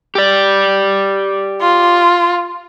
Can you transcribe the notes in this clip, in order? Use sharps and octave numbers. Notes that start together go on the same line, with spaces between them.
G4 D5
F4